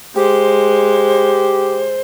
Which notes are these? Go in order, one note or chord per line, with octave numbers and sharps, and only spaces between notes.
G#3 G4 C5